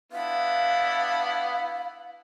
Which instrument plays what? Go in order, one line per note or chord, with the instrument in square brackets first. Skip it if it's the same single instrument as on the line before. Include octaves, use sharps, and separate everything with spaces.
[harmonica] B3 D4 E4 [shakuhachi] F5